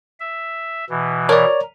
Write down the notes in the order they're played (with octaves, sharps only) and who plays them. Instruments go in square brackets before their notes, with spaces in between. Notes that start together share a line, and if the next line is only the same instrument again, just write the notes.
[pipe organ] E5
B2 E3
[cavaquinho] A#4 [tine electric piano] C#5 D5